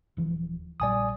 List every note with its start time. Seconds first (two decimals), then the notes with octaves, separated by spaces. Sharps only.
0.17 D#1 E3 F3
0.80 A#1 A#2 G3 D5 G#5 D#6